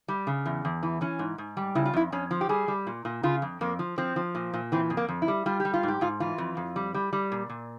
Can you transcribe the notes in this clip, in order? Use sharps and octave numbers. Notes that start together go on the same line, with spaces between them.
G3
C#3
E2
E2
E3
E3 C#4
G#2
G#2
G3
C#3 E4
F4
F2 E4
F2 C#4
F3
G4
G3 G#4
G3
A#2
A#2
C#3 F4
F2
F2 A#3
F3
F3 C4
F3
A#2
A#2
E3 C4
F2
A#3
F2
E4
G3
G3 F4
G4
G3
F4
G#2 G4
G#2 F4
E3 F4
F2
F2
G3
G3
G3
A#2
A#2